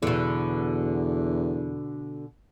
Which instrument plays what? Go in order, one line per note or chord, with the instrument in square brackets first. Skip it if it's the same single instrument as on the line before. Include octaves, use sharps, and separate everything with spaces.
[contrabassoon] E2 [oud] B2 D3